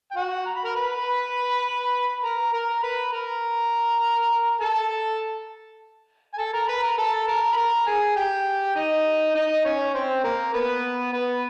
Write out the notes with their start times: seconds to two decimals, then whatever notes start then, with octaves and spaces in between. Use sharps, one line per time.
0.11 G5
0.16 F#4 F#5
0.46 A#5
0.56 B5
0.65 A#4 A#5
0.75 B4 B5
2.24 A#4 A#5
2.53 A#4 A#5
2.83 B4 B5
3.13 A#4 A#5
4.61 A4 A5
6.34 G#5
6.38 A4 A5
6.53 A#4 A#5
6.68 B4 B5
6.83 A#4 A#5
6.98 A4 A5
7.28 A#4 A#5
7.53 B5
7.57 A#4 A#5
7.86 G#4 G#5
8.16 G4 G5
8.75 D#4 D#5
9.35 D#4 D#5
9.65 C#4 C#5
9.94 C4 C5
10.24 A#3 A#4
10.54 B3 B4
11.13 B3 B4